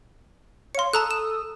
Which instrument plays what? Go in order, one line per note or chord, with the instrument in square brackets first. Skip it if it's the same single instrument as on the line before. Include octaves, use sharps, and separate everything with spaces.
[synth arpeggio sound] C#5 F5 [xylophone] C6 C#7
[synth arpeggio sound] A4 D#6 E6 [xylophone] A5 A#5 F#6
[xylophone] E7